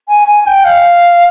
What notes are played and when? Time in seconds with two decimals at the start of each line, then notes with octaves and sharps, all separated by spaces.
0.08 G#5
0.28 G#5
0.47 G5
0.65 F5